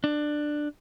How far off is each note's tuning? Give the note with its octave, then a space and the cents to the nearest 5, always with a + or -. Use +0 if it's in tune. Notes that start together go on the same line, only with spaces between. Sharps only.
D4 +15